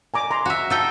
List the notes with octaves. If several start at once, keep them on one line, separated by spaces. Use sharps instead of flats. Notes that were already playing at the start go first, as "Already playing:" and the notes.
G#5 A#5 D6
A#5 C6
F#4 E5
D#4 A4 G5